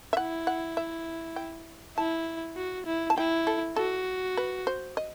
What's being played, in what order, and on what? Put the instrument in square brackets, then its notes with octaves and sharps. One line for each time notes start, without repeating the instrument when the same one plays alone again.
[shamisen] E5
[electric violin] E4 [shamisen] F#5
[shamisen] F#5
E5
G5
[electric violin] E4 [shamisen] A5
[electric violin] F#4
E4
[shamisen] A5
[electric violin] E4 [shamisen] G5
[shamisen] A4
[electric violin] F#4 [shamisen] A4
[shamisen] B4
C5
D#5